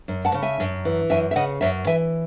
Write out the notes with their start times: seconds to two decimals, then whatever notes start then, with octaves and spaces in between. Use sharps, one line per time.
0.08 F#2
0.25 F#5 A5
0.34 C#3
0.42 E5 G#5
0.60 F#2
0.85 E3
1.10 F#2 E5 G#5
1.31 E5
1.36 C#3 D#5 F#5
1.61 F#2 C#5 E5
1.87 E3 E5 G#5